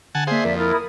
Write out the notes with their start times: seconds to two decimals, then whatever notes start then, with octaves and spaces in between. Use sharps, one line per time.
0.15 D3 F#5 G#5 A5
0.27 A#3 G#4 C5 D5 E5 F5
0.45 F2 A#4 B6
0.57 E4 A#4 D#6 F6 A6
0.73 B5 D#6